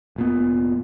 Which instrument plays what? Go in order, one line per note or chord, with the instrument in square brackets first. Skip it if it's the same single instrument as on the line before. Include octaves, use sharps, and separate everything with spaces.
[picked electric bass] F1 A#2 B3